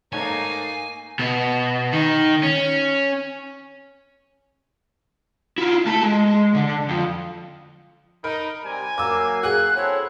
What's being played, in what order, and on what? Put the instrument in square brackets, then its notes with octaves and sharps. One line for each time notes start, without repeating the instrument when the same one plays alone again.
[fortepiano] G#2 A3 C#5 [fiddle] A#3 D#4 [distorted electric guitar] G#5
[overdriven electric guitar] B2
D#3
C#4
[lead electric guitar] E4 F4
A3 A5
G#3
D3
F2
[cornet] D#4 [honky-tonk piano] A#4 B5
[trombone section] C3 G3 [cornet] G#5
[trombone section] F#3 A#3 [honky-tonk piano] D6 E6
[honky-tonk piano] F#4 G#4 [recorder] F#6
[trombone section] C4 A4 [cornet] E4 [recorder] C#5